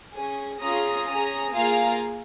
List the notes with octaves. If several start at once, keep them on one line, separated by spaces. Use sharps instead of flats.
C#4 G#4
C#4 F4 G#4 A#5 D#6
C#4 G#4 A#5 D#6
A#3 F4 G#4 F5 A#5